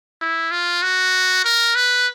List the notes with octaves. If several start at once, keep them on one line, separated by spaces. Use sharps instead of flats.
E4
F4
F#4
A#4
B4